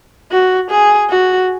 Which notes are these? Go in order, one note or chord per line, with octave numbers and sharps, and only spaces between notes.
F#4
G#4
F#4